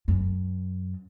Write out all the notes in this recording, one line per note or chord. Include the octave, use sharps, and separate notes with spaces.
F#2